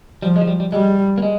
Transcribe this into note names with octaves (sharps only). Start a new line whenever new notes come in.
F3 G3
G#3
F3
G3
G3
G3 G#3
A#3
G#3